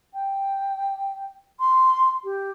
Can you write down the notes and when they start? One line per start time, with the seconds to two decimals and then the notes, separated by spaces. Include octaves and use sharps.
0.13 G5
1.59 C6
2.24 G4